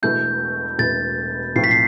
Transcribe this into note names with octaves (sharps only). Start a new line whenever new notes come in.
E1 E2 B2 A3 E4 G6
E1 E2 B2 A3 E4 A6
B1 A2 F3 C4 C7
B6
C7